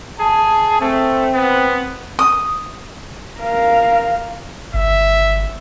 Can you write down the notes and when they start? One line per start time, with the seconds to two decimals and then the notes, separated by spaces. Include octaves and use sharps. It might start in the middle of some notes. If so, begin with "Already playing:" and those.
0.20 G#4 A5
0.81 A3 C4
1.33 B3
2.19 D#6
3.40 A#4 F5
4.74 G1 E5